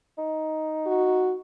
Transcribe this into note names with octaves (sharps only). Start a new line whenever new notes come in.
D#4
F#4